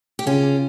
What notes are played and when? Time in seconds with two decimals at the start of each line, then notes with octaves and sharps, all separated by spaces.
0.19 G4
0.26 C#3 C#4 F4